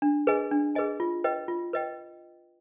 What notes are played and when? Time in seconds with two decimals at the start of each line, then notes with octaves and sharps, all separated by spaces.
0.02 D4
0.27 G#4 B4 D#5 G#5
0.51 D4
0.75 G#4 B4 D#5 G#5
1.00 F4
1.24 B4 D#5 G5
1.48 F4
1.73 B4 D#5 G5